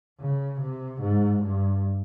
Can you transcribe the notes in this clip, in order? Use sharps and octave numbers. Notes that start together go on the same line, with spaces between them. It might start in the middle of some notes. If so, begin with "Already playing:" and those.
C#3
C3
G#2
G2